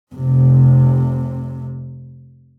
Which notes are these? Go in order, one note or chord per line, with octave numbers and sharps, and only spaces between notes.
F1 C3